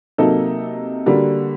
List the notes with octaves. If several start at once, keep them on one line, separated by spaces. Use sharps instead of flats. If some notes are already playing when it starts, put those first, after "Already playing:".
C3 F#3 A#3 D#4 A4
D3 G3 A#3 F#4